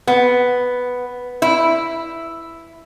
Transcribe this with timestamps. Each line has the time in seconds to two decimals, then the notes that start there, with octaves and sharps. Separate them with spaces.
0.07 B3
1.42 E4